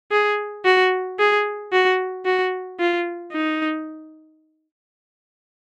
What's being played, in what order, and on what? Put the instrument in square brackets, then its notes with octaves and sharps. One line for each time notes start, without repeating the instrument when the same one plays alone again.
[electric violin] G#4
F#4
G#4
F#4
F#4
F4
D#4